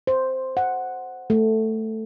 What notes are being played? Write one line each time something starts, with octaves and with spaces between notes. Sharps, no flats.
C5
F#5
A3